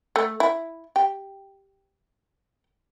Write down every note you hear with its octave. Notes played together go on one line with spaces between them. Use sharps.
A3
E4
G4